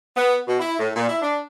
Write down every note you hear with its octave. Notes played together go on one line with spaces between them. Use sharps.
B3
B2
E4
A2
A#2
E4
D4